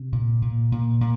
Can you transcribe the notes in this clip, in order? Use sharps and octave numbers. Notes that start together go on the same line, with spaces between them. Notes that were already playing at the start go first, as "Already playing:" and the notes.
Already playing: C3
A#2
A#2
A#2
A#2